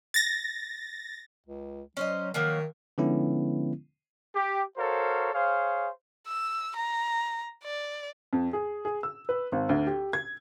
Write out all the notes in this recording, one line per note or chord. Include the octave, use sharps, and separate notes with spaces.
A6 A#6
C#2
F#3 C#4 C5 D#5
D#3 F3 F#3 A#3
D3 F3 G#3 B3 C#4 E4
G4
F#4 A4 A#4 C5 C#5 F5
G#4 C5 C#5 F5
E6
A#5
D5
F2
G#4
G#4
E6
B4
G#1
D2
G4
G#6